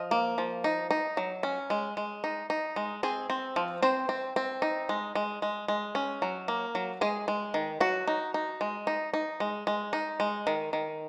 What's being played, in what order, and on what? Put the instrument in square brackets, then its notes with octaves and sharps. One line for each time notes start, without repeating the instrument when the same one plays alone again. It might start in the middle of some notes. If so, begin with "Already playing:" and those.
Already playing: [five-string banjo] F3 D#5
A#3
F3
D#4
D#4
F#3
C#4
G#3
G#3
D#4
D#4
G#3
C4 G#4
C4
F3
C4 C5
C4
C4
D#4
G#3
G#3
G#3
G#3
C#4
F#3
A#3
F#3
G#3 G#4
G#3
D#3
F#3 F#4
D#4
D#4
G#3
D#4
D#4
G#3
G#3
D#4
G#3
D#3
D#3